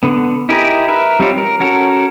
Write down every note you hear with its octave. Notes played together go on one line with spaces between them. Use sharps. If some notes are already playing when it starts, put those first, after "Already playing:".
D3 B3
D#4 E4 G4 G#4 A#4
A#4 B4 E5
G3 C4 D#4 F4 C#5
A#4
C#4 F#4 A4 A#4